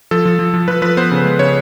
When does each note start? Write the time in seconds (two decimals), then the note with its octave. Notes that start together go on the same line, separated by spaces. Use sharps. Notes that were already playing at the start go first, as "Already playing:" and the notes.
0.11 F3 A4
0.25 F3
0.39 F3
0.54 F3
0.68 F3 B4
0.82 F3 B4
0.97 B3 C5
1.11 C#3
1.25 G#3
1.39 C#3 C#5